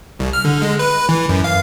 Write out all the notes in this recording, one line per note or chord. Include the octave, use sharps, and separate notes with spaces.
C2
F6
D3
G#3
B4
E3
F#2
F5